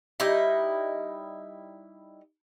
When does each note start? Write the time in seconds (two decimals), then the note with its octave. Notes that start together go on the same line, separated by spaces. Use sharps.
0.20 G3 D#4 E4 D#5